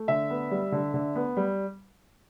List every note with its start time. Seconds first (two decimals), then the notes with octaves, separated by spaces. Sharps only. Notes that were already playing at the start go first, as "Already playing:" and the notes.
Already playing: A3
0.08 D3 E5
0.30 B3
0.51 G3
0.72 D3
0.94 D3
1.16 B3
1.37 G3